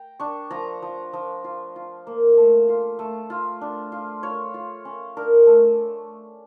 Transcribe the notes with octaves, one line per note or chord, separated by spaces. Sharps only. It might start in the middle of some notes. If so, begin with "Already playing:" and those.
Already playing: G5 A#5
D4 C#6
F3 A#5
F3
F3
F4
F4
A#3
A3
F4
A3
F4
D4
F4
F4 C#5
F4
C#4
D4 A#4
A3